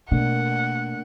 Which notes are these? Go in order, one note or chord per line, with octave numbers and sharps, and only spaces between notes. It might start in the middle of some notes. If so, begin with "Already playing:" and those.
B2 A3 A#3 D4 F#5